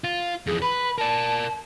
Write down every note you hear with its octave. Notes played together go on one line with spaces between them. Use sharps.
F4
F2 E3 G#4
B4 B5
A#4 D5 A5